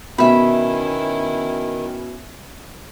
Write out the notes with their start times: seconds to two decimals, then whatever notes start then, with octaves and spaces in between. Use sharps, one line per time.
0.18 B2 D#3 C#4 E4 E5 B5